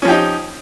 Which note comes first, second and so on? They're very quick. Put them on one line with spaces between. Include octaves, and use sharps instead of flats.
C#4 F3 G4 D#4